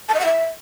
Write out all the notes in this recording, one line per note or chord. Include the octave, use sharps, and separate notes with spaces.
A5
D#5
F#5
E5